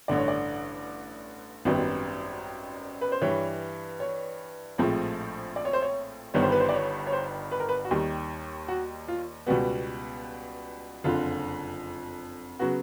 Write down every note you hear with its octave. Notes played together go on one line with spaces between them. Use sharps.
A1 G2 D3 D5
C#5
D5
G#1 F#2 D#3 G3 B3
B4
C5
G2 E3 G3 C#5
C#5
A#1 A2 F3 G#3 C4
D5
C#5
C5
C#5
G1 G2 D#3 G3 B3 C#5
C5
B4
C5
D5
C#5
C#5
C5
B4
A#4
B4
F#4
D#2 D#3 G3 G4
F#4
F4
C#2 B2 G3 B3 F#4
F#1 F2 D3 F4
C#3 F#3 B3 F#4